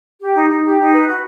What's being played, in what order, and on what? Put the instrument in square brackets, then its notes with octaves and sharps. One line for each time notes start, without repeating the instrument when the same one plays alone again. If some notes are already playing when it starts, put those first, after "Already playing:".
[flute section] G4
D#4
D#4
G4
D#4
B4
F#4